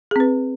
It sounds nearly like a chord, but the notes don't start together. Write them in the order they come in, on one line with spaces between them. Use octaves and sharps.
G#4 C4 B4